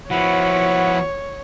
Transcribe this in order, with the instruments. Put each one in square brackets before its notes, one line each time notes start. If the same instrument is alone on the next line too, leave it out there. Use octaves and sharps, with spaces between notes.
[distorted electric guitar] F3 B3 [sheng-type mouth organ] E4 F#5 B5 [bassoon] F#4 [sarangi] C#5